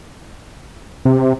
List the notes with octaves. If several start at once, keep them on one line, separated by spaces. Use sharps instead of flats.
C3